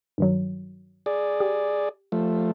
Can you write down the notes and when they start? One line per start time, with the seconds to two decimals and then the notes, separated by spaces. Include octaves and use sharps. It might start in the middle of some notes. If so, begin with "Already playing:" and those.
0.18 G2 D#3 F#3
1.06 G#4 D5
1.40 G4
2.12 F3 A3